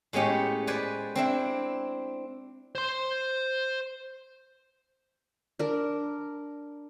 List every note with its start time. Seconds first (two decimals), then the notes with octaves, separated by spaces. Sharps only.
0.13 A2 G#3 B3 C#4 G4
0.67 B4 C5 D5 G#5
1.15 C4 D4 E4
2.75 C5 C6
5.59 D4 A#4